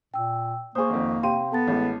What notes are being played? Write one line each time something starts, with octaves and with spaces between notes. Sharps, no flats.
A#2 G5 E6
A#3 G#4 C5 C#6 D#6
G#1 F2
C3 G4 F5 G5 C6 D#7
B3 A4 A5 A6
A1 E3 G#3